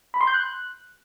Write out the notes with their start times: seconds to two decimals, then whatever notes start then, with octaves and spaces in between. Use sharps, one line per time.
0.14 B5
0.21 C6
0.27 G6
0.34 F#6